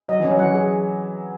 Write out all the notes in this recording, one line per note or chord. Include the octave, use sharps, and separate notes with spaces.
F#3 D#5
E3 C#4
F#3
E3 F#5
G#4